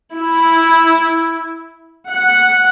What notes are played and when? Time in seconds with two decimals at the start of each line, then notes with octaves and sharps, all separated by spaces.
0.16 E4
2.09 F#5